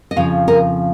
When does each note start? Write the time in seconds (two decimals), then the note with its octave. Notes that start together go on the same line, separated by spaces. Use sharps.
0.11 D#5
0.16 F2 C#3 F3 F5
0.48 A#4 D#5